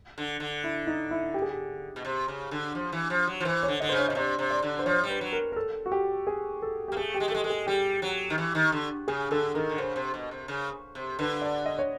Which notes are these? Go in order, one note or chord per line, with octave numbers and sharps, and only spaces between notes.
D3
D3
E4
D#4
E4
G4
G#4
G4
B2
C3
C#3
D3
F3
E3
F3
F#3
F3
E3 C5
C#5
D3
D3 D#5
C#3 C5
C#5
C#3 D#5
C3 D5
C3
D5
D3
C5
F3 C#5
G3
B4
F#3
A#4
A#4
A4
F#4
G4
G#4
A4
A#3 G4
A3 G#4
G4
G#3
A3
G#3 A4
G#3 A4
G#4
G3 G4
F#3
D#3
E3
D#3
D3
C#3 G#4
D3 A4
D#3 A#4
D3
C#3 C5
C3
B2
C3
C#3
C3
D3 B4
D5
D#5
C#5